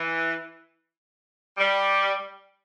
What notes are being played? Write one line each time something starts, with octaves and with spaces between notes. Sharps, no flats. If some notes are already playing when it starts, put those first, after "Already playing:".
Already playing: E3
G3